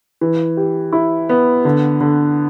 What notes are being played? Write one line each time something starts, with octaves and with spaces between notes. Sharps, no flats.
E3
G4
E4
B3
D3
D3